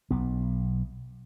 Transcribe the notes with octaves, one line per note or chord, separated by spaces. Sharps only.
B1 B3